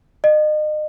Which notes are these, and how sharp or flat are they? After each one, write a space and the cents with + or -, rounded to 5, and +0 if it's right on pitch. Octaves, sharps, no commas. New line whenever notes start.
D#5 -35